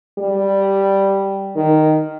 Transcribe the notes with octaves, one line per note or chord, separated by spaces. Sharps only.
G3
D#3